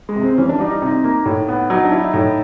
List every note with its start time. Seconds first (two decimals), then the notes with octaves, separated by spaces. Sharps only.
0.09 G#3
0.16 C3
0.23 C4
0.37 E3 C#4
0.49 D4
0.60 G3 D#4
0.71 D#4
0.82 C3 D#4
1.04 A#3
1.26 A2
1.48 B3
1.70 F#3 D#4
1.84 D4
1.92 E4
1.99 D#4
2.13 A2 D#4